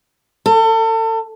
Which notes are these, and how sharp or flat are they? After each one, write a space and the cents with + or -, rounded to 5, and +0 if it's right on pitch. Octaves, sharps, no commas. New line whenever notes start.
A4 +35